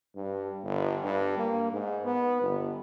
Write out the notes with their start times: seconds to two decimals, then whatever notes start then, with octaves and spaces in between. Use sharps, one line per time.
0.16 G2
0.64 G1
1.04 G2
1.38 A#3
1.73 G#2
2.05 B3
2.41 G1